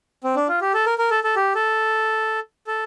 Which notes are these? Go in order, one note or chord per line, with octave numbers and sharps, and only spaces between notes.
C4
D4
F4
G4
A4
A#4
A#4
A4
A4
G4
A4
A4